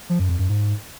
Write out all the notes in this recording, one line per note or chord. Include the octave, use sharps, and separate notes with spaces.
F3
F#2
F2
F#2
G#2